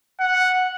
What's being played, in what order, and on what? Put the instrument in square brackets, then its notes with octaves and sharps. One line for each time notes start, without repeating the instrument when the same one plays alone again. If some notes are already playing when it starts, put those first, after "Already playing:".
[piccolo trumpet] F#5